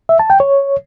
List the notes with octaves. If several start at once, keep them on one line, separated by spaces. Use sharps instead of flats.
E5
A5
G5
C#5